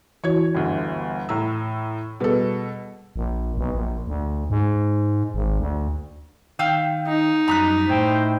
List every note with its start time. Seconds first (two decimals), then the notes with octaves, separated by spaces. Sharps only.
0.24 E3 E4 F#4 C#5 G#6
0.55 G1 D2
1.29 A2 A#5 E6
2.20 B2 G3 G#4 A4 B4
3.16 A#1
3.58 B1
3.75 A#1
4.07 D2
4.50 G#2
5.34 G#1
5.60 D2
6.59 D#3 F5 G5 E6
7.07 D#4
7.48 F#2 G3 A#5 D#6 F#6
7.89 A2 C5 E5 G5